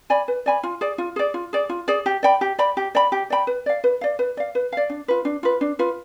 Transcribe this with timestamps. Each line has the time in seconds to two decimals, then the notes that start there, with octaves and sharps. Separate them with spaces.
0.10 D5 G#5 B5
0.28 B4
0.46 D5 G#5 B5
0.63 F4
0.81 G#4 D5
0.98 F4
1.16 G#4 D5
1.34 F4
1.53 G#4 D5
1.69 F4
1.88 G#4 D5
2.06 G4
2.23 D5 G5 B5
2.41 G4
2.59 D5 G5 B5
2.77 G4
2.95 D5 G5 B5
3.12 G4
3.30 D5 G5 B5
3.47 B4
3.66 D5 F5
3.84 B4
4.01 D5 F5
4.19 B4
4.37 D5 F5
4.55 B4
4.72 D5 F5
4.90 D4
5.08 F4 B4
5.25 D4
5.43 F4 B4
5.61 D4
5.79 F4 B4